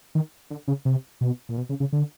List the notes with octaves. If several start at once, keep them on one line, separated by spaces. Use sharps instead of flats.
D#3
D3
C#3
C3
B2
A#2
B2
C#3
C#3
D3